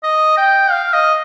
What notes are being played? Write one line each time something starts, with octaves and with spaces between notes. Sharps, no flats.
D#5
G5
F5
D#5